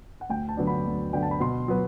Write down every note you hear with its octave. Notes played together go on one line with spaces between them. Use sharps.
F#5
D2 G5
A5
D3 F#3 B3 D4
B5
D2
D3 F#3 B3 D4 G5
A5
B5
B2 C6
F#3 B3